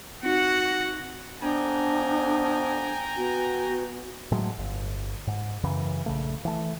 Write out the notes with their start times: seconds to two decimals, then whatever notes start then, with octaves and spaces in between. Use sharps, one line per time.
0.23 C4 D#4 F#4 F#5
1.42 F2 B3 D4 G5 G#5 A#5
3.17 B3 F#4
4.32 A2 F#3 G#3 A3
4.58 G1
5.27 G#2
5.64 F#2 C#3 E3
6.06 A#1 C#3 A3
6.45 E3 A3